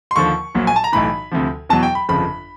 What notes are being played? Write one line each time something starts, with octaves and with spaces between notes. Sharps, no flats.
C6
D#2 D3 F3 C#6
A#1 A#2 F#3
G#5
A5
A#5
B1 A2 E3 B5
D2 C3 F3
E2 B2 F#3 A5
G5
B5
G1 F2 C#3 F3 B5